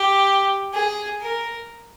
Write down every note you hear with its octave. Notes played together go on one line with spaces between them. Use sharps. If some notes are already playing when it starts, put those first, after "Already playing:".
Already playing: G4
G#4
A#4